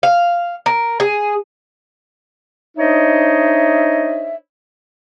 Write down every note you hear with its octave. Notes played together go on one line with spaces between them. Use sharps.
F5
A#4
G#4
D4 D#4 C5 C#5 D#5 E5